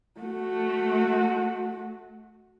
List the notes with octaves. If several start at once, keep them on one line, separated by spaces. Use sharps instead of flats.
A3 F#4